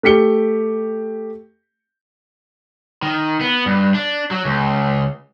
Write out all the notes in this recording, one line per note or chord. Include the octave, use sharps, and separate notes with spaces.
A3 G4 B6 C#7 G7
D#3
B3
G2
D4
F#3
C#2